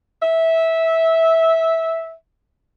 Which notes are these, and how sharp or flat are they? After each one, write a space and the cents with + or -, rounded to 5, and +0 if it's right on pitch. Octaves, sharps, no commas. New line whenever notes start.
E5 -15